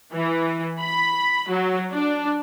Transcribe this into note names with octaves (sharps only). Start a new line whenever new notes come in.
E3
B5
F#3
D4